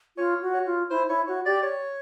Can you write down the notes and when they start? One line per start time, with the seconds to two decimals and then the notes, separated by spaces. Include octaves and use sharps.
0.17 F4 C#5
0.42 F#4
0.54 C#5
0.66 F4
0.90 E4 C5
1.09 E4 C#5
1.27 F#4 C#5
1.46 G4 D5
1.63 C#5